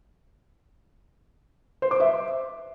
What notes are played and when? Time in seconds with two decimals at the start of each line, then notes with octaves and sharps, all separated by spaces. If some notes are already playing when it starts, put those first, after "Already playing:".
1.82 C5
1.91 D6
2.00 E5